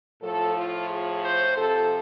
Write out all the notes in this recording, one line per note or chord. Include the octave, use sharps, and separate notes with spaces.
A2 F3 A4
F4
G#4
C5
C3 F3 A4